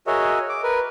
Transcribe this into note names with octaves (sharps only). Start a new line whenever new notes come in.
F#4 G#4 A#4 C#5 D#5 E5
D6
A#4 B4